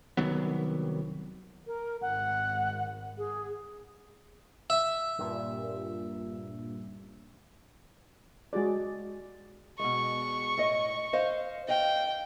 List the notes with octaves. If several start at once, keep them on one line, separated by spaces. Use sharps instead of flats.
C2 D#3 F#3 B3
A#4
G#1 F#5
G#4
E5
G2 A#2
G#3 F#4 G#4 D5
B2 G#3 C#6
A2 D#5
C5 D#5 F5
D#5 F5 G5